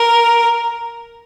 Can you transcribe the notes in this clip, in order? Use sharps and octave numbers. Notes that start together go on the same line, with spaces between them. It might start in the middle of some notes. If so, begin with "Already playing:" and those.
Already playing: A#4